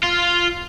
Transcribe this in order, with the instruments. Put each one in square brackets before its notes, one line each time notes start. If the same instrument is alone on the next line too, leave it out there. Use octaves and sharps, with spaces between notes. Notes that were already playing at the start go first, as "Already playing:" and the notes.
[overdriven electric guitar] F4